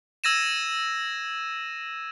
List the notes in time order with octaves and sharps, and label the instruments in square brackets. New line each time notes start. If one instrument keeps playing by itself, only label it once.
[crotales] E6 G#6 A#6 D#7 E7